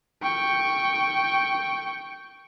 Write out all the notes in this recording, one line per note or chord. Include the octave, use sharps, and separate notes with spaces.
G5 C#6